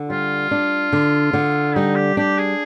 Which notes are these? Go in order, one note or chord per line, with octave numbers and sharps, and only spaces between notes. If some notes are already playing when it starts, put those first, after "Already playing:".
Already playing: D3
G3 F4
D4
D3
D3
G3 D#4
G4
D4 G4
G#4